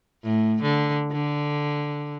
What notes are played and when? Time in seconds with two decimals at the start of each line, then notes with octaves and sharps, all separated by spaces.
0.23 A2
0.62 D3
1.12 D3